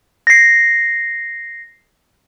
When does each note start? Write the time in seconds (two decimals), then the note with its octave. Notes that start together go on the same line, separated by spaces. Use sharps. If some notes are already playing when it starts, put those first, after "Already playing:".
0.27 A#6 C7